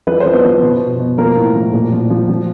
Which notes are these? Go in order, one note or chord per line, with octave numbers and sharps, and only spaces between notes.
F3 B4
C5
F3
B3 B4
F3
B2
B2
B2
F3 A#3 A#4
A2
F3
A#2
F3
F3
F3